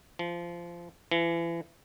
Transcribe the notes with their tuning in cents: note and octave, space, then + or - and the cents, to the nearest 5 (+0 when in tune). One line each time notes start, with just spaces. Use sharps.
F3 -20
E3 +35